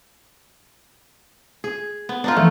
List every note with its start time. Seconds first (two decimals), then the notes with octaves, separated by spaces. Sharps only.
1.64 G#4
2.09 B3
2.24 D4 D#4 F4
2.36 E3 F3 A3